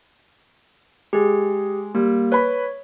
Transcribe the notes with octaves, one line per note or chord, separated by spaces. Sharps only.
G#3 G4 G#4
G3 A#3
B4 C#5 B5